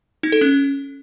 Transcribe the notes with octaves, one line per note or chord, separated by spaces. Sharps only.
D#4
A4
C#4